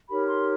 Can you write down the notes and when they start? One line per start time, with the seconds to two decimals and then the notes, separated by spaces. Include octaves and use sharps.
0.09 D#4 G4 A#4 C#5 B5
0.28 C6